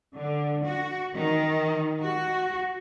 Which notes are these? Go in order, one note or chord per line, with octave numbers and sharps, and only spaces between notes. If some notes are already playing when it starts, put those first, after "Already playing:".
D3
F#4
D#3
F#4